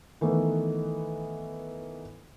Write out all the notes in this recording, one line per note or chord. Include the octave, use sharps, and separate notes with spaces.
D#3 E3 A3 B3